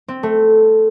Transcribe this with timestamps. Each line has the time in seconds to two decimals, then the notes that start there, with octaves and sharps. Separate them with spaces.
0.08 C4
0.23 A3